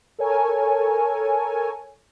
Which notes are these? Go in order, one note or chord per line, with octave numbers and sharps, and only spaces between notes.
A4 A#4 C#5 G#5